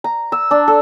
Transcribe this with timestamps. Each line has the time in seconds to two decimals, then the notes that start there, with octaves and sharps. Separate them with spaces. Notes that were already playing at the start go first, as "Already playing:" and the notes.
0.04 A#5
0.32 E6
0.51 D4
0.68 A4